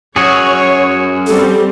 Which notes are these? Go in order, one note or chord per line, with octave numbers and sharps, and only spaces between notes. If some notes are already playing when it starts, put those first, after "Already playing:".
F#2 F#4 G#4 C#5
G3 C4 A4